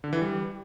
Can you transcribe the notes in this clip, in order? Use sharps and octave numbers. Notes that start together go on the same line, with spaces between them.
D3
E3
G3